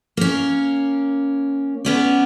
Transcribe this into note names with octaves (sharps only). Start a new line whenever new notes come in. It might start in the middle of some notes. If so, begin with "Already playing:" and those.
A#3 C#4
B3 C#4 D5